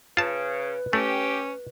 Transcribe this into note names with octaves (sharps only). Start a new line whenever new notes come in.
C#3 F4 B4 A5
A3 C#4 G4